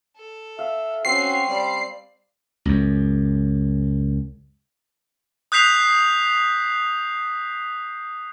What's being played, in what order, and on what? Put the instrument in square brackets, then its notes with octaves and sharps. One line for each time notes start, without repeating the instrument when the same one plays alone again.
[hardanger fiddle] A4
[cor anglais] E5 [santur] F5
[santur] C4 C6 [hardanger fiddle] C#4 [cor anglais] F#4 [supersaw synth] C7
[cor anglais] G3 [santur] C5 [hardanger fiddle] D5
[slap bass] C#2 F#2
[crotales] D#6 F#6 G6 B6 C7 F7